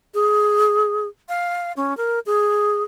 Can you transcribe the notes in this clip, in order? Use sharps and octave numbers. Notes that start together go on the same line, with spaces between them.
G#4
F5
C#4
A#4
G#4